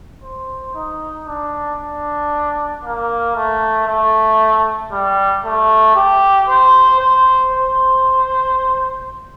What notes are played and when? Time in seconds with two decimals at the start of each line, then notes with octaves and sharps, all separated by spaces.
0.23 C5
0.75 D#4
1.28 D4
1.80 D4
2.84 A#3
3.36 A3
3.88 A3
4.92 G3
5.45 A3
5.96 G4
6.48 C5
7.00 C5
7.53 C5